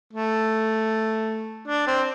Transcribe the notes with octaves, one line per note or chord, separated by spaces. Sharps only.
A3
D4
C4